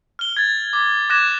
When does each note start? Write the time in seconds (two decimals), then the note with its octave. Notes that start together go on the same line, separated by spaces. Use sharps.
0.19 F6 G7
0.37 G#6 A6
0.73 D6
1.10 D6 F#6 G#6 A#6 E7